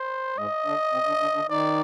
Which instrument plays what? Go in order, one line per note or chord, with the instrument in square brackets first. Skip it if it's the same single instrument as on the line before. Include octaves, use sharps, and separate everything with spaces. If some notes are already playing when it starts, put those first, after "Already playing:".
Already playing: [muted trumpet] C5
[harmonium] G#2 G#3 [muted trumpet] D#5
[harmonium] D3 D4
C3 C4
D3 D4
D3 D4
D3 D4
[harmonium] D#3 D#4 [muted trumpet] D5